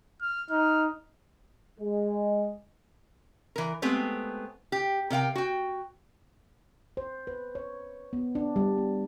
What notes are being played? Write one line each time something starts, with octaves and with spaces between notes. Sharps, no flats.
F6
D#4 F6
G#3
E3 A#4
G#3 A3 B3 C4 G4
G4
C3 A#4 F5 G5
F#4 G5
C5
B4
C#5
B3
D4
G3
B3